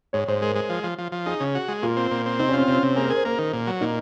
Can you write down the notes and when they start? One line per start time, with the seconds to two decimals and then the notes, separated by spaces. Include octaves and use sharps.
0.13 G#2 C#5
0.28 G#2 C5
0.41 G#3 A#4
0.56 G#3
0.70 F3
0.83 F3
0.98 F3
1.12 F3
1.26 D#4 G#4
1.40 C#3
1.55 F#4
1.68 G#3
1.82 A#2 F4
1.97 C4
2.11 A#2
2.26 C4
2.39 C3 D#4
2.49 C#4
2.53 F4
2.58 C4
2.68 C3 C#4
2.83 C3
2.96 A#3 G#4
3.05 A#4
3.10 G#4 C5
3.25 A#3 A#4
3.38 D#3
3.53 A#2
3.67 F#3
3.81 A#2 D#4